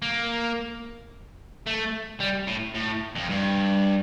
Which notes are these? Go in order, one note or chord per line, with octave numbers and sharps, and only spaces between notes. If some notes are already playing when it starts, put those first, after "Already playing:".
A#3
A3
G3
A2
A2
F2
G2